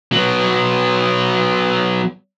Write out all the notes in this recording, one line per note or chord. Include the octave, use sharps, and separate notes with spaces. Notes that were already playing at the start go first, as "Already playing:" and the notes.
F#3 B3